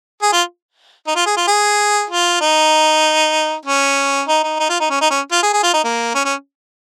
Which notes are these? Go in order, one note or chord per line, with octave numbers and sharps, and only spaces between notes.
G#4
F4
D#4
F4
G#4
F4
G#4
F4
D#4
C#4
D#4
D#4
D#4
F4
D#4
C#4
D#4
C#4
F4
G#4
G#4
F4
D#4
A#3
C#4
C#4